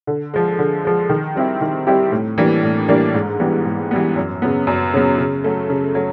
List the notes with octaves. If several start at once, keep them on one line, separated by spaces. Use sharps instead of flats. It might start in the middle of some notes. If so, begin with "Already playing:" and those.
D3
F3 G#3
D3
F3 G#3
D#3
G3 C4 E4 G4
D#3
G3 C4 E4 G4
A2
E3 G3 A#3 D4
A2
E3 G3 A#3 D4
G#2
E3 G3 B3
G#2
E3 G3 B3
F#2
C#3 F#3 B3
F#2
C#3 F#3 B3
C#3
F#3 A3
C#3
F#3 A3